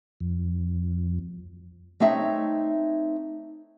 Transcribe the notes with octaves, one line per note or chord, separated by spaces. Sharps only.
F2
A3 C4 D#4 C#5 E5